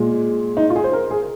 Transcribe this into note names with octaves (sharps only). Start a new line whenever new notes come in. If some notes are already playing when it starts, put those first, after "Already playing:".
Already playing: A#2 G#3
D#4
F4
G#4
C5
A#4
G#4